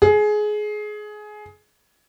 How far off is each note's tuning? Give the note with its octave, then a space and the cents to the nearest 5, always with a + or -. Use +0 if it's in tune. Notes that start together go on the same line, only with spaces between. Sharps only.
G#4 +20